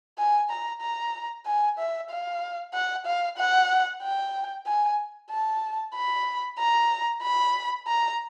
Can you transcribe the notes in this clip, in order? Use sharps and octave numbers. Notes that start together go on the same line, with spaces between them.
G#5
A#5
A#5
G#5
E5
F5
F#5
F5
F#5
G5
G#5
A5
B5
A#5
B5
A#5